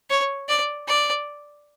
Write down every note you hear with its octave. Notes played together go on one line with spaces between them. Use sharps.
C#5
D5
D5